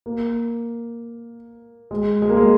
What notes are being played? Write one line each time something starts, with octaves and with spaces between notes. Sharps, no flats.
A#3
G#3
G#3
A#3
G#3